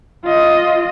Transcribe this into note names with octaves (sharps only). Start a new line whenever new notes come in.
F4 D#5